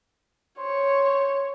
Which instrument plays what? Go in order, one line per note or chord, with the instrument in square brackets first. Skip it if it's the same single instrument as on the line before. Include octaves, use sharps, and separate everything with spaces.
[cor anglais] C5 [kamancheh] C#5